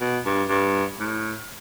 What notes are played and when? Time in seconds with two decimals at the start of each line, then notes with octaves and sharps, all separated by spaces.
0.01 B2
0.26 G2
0.49 G2
0.99 A2